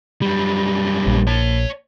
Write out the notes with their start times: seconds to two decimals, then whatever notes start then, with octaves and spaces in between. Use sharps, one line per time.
0.22 F#2 G3
1.07 A#1
1.27 C#5 A5